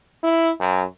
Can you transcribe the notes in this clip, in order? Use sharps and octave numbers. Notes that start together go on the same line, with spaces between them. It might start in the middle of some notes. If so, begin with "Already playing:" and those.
E4
F#2